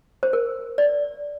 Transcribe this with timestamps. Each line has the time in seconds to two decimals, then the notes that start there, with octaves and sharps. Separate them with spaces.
0.23 C5
0.33 A#4
0.78 D5